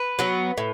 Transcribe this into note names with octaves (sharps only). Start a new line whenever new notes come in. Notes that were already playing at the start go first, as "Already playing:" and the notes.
Already playing: B4
F#3 B3
A2